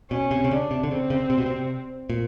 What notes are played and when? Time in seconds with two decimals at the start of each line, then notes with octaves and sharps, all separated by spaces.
0.11 B2 C#4
0.31 C3
0.44 C3
0.51 C#3 D4
0.71 C3
0.83 D3
0.91 C#3 C4
1.10 C#3
1.30 C3
1.38 B2
1.46 C3
2.10 A#2